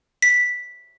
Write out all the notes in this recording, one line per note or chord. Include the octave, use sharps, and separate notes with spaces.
B6